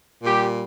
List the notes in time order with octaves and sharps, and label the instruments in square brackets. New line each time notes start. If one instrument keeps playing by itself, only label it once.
[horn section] A#2 G3 G4